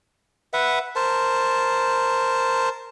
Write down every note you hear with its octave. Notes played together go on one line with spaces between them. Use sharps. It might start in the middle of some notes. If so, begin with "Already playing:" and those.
B4 E5 F#5
A#4 C5 A5